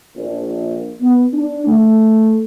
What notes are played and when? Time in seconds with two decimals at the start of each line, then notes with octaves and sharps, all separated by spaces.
0.16 A#1
1.01 B3
1.33 D4
1.66 A3